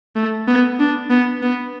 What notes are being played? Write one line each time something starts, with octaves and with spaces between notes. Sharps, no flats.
A3
B3
D4
B3
B3